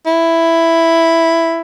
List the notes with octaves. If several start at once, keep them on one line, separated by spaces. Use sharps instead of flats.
E4